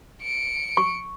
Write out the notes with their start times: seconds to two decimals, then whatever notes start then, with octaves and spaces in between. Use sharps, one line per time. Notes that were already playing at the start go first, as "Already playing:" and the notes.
0.22 C#7 D7
0.77 C#6